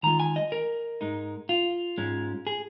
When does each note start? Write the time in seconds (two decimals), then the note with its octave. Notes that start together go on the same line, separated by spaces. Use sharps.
0.03 D#3 G#3 F4 A#5
0.20 G#5
0.36 D#5
0.52 A#4
1.01 G#2 G#3 D#4
1.49 F4
1.98 G#2 G#3 C#4
2.47 G#4